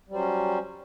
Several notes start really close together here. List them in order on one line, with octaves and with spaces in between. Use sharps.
G3 F#3 C5 C#4